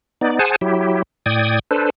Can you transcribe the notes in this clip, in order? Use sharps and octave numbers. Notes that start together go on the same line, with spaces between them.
B3 D#4 D5
G#4 C5 F#5 G#5 A5
F#3 E4 G4
A2 D5 G5 D#6 G#6
D4 A4 B4 C5